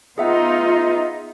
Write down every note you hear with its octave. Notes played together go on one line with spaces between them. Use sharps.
B3 D#4 F4 G#4 E5 F#5